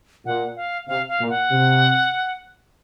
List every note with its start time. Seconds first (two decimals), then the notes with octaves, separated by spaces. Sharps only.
0.25 A#2 F#5
0.56 F5
0.88 C3 F5
1.09 F5
1.19 A#2
1.29 F#5
1.51 C3